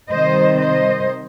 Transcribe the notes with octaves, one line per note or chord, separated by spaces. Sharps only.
C3 D#3 G3 C5 D#5
C5 D#5